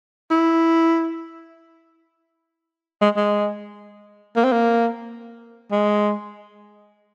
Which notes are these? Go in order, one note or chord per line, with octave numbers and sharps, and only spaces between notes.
E4
G#3
G#3
A#3
C4
A#3
G#3